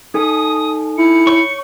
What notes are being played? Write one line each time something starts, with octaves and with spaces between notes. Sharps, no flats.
D#4 A4 G#5 D#6
E4 C#7
C#5 C#6